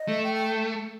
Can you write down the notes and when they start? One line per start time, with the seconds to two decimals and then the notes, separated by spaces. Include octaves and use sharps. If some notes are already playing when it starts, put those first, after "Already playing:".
Already playing: D#5
0.08 A3
0.24 G5
0.35 G5